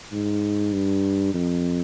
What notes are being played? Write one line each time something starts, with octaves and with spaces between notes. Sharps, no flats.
G#2
G2
F2